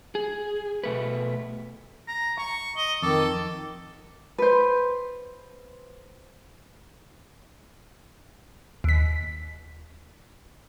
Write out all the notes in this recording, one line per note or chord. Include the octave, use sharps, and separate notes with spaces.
G#4
B2 A3 B4
A#5
A#5 C#6
D#5 G7
F2 D#3 A4 D6
B4 C5
D#2 B6